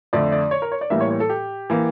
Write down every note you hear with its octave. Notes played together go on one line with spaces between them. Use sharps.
F2 D3 A3 D5
D5
C#5
A#4
C#5
D5
A2 E3 G3 A#3 E5
C#5
C#5
A4
G4
E3 A#3